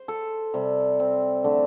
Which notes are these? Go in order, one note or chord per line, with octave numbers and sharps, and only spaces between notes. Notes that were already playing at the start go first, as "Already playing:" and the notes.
Already playing: C5
A4
C3 G3
C4
D3 A3